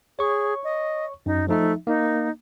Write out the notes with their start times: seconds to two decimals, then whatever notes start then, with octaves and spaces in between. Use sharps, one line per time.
0.19 G#4 C#5 C#6
0.64 D#5
1.26 F#2 D#4
1.48 F3 A3 D#4 E5
1.87 A#3 D#4